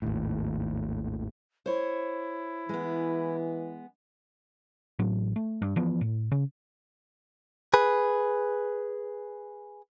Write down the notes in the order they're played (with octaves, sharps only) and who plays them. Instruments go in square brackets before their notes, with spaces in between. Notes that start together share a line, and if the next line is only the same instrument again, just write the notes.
[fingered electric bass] G#1 D#2 A2
[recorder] E4 [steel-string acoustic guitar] C5 C#5
[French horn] E3 [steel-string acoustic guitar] G#3 B3
[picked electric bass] A1 A2 F#3
A3
G2
E3 F3 B3
A2
C#3
[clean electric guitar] G#4 B4